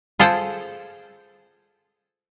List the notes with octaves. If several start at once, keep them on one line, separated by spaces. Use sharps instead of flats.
F4 G#4 A4 C5 G5